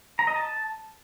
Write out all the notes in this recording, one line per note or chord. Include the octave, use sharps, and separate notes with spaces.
A#5
D#5
A5